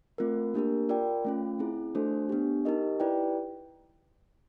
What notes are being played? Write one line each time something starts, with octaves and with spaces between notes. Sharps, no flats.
A3 C4 F4 A#4
A#3 D4 G4 A#4
F4 A#4 D5 G5
A3 C#4 F4
C4 E4 G#4
A3 D4 F#4 A4 C5
B3 D4 G4
D#4 G4 A#4 D#5
E4 G4 B4 D5 G5